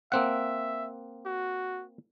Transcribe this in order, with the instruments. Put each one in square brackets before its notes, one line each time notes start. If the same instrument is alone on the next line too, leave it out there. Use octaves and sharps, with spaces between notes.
[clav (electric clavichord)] A#3 C4 F#5 [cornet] E5
[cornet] F#4